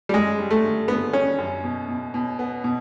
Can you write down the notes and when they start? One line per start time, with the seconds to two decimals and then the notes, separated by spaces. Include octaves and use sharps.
0.09 G3
0.13 F#2 G#3
0.39 G3
0.51 A3
0.64 D3
0.88 D3 B3
1.13 G3 C#4
1.39 F#2
1.64 B2
1.89 B2
2.14 B2
2.39 B3
2.64 B2